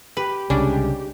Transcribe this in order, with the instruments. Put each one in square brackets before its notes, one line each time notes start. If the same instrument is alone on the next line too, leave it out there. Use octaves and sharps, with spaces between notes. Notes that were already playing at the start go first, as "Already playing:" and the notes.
[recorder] G4 [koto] B4
[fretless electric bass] C2 C#3 [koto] G3 C#4 D4 [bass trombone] G#3